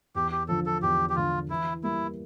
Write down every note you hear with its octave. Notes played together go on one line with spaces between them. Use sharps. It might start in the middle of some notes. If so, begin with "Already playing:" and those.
E2 G4
G4
D3 F3 A4
A4
E2 G4
G4
D3 F3 F4
E3 E4
G3 A#3 E4